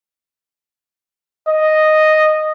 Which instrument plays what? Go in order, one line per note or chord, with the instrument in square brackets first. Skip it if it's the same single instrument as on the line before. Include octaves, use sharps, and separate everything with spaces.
[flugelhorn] D#5